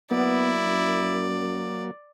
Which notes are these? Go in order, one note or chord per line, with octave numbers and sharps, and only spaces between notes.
F#3 A#3 B3 E4 D5
F#2